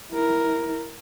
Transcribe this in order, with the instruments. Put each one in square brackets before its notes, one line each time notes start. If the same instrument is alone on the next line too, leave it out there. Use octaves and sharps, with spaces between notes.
[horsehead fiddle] E4 A#4